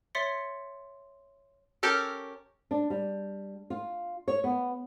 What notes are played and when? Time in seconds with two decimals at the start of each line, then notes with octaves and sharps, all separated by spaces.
0.15 C#5 E5 C6 A6 B6 C#7
1.83 C#4 G4 A4 A#4
2.71 D4
2.90 G3
3.70 F4
4.28 C#5
4.44 B3